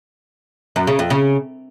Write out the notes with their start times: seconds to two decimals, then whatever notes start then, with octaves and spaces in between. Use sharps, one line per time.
0.76 F#2
0.87 C#3
0.99 F2
1.10 C#3